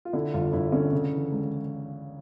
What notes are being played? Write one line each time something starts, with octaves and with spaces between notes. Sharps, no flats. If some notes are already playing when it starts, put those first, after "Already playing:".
F4
D3 E4
G1 F4
G1 E4
D3 C#4
C#3
E3
C#2